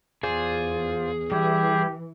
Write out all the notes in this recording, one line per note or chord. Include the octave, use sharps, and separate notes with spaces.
E2 F4 G#4 C5 D5
E3 G3 E4 G4